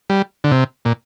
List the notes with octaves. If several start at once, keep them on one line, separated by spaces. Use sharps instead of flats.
G3
D3
C3
A#2